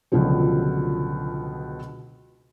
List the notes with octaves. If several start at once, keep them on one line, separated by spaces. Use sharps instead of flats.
C#2 B2 D3 F3 F#3